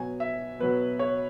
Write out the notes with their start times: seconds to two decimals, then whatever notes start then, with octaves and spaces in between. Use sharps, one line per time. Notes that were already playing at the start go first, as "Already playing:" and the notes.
Already playing: B2 F#3 B3 G#5
0.20 E5
0.59 B2 F#3 B3 B4
0.99 C#5